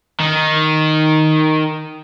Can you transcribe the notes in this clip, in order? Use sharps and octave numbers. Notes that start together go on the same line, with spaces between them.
D#3